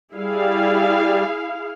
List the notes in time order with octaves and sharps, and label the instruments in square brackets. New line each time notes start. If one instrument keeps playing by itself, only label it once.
[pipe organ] G3 [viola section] E4 G#4 F5